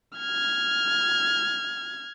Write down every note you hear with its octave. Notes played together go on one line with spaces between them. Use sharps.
F6 G#6